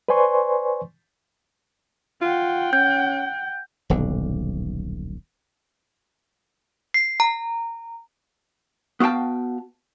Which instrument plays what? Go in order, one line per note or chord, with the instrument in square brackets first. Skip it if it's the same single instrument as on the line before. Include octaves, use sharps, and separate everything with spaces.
[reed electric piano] B4 C5 D5 G#5 C6 C#6
[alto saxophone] F4 [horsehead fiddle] F#5 G5
[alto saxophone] C#4 [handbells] G6
[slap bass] D#1 B1 D3
[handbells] C7
A#5
[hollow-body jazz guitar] B3 F#4 F5 G5 A5